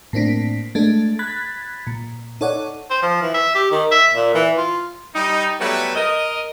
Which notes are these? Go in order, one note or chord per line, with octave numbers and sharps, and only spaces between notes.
A2 A#3 C4 D4 B6
G#3 A3 D4 A4
B5 F#6 G#6 A6 B6
A#2
D#4 A4 C#5 D5 F#5
C5
F3
E3
E5
G4
D#3
E5
A#2
E3
F4
G3 D#4
F#3 G3 A3 B3 E4 B4
A#4 D#5